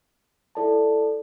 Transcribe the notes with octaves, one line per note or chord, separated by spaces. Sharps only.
E4 A4 D5 A5